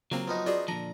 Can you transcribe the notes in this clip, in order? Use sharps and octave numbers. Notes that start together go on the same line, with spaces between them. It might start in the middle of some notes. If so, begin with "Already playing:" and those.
C#3 F#3 A#3 C4 F4 A#4 C5 A#5
F3 B3 D#4 B4
C#4 F4 F#4 G#4 D5 D6
A#2 D3 F3 A5 A#5